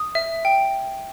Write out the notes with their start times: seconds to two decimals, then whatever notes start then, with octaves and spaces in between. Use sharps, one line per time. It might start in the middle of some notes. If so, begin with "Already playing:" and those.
Already playing: D#6
0.15 E5
0.45 G5